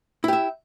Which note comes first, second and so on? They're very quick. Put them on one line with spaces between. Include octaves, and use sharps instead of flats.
E4 G4 E5